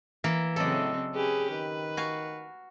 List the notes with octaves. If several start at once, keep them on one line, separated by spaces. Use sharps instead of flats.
E3 A#3 A#4
A2 C#3 F#3 C4 A4 D5 D#5
C#4 G4 G#4 B4
D#3 B4
F#4 F5 G#5